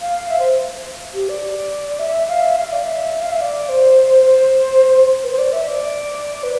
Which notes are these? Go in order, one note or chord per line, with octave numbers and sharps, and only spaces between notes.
F5
E5
C5
G4
D5
E5
F5
E5
F5
D5
E5
F5
E5
D5
C5
C5
B4
C5
D5
E5
D5
B4